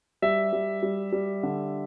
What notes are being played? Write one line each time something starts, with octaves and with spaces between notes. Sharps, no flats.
G3 E5
G3
G3
G3
D3